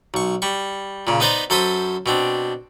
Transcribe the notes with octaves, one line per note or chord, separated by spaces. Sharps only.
B1 C#6
G3 C#6
A#2 C#3
B3 D#4 B4 C5 D5 A#5
F#2 A4 C5 B5 D#6
B2 C4 D4